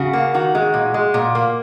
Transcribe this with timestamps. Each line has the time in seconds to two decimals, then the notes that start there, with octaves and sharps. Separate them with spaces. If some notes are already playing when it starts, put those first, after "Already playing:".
Already playing: C#3 F#4
0.13 A#3
0.34 D#3 F#4
0.55 G#3
0.74 A#2
0.94 G#3
1.14 A#2
1.35 A#3